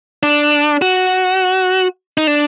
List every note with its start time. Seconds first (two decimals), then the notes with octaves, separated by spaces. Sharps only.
0.23 D4
0.82 F#4
2.18 D#4
2.27 D4